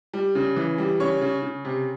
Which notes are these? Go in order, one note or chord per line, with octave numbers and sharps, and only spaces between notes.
G3
C#3
E3
G3
C#3 C#5 C#6
C#3
C#3
C3